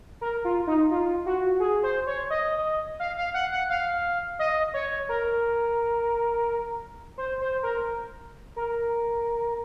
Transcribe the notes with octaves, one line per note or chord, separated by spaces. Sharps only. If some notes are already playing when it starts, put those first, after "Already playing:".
A#4
F4
D#4
F4
F#4
G#4
C5
C#5
D#5
F5
F5
F#5
F#5
F5
D#5
C#5
A#4
C5
C5
A#4
A#4